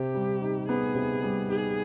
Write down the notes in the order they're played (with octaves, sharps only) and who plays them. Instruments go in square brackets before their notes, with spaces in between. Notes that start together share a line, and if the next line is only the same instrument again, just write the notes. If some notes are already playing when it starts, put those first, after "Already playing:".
Already playing: [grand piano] C3 [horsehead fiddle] G4
[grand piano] G3
D#4
[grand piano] B3 [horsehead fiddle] G#4
[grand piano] C3
G3
[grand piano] D#4 [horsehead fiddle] G#4